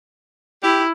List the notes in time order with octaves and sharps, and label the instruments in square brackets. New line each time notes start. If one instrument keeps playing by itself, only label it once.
[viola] E4 [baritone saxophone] G4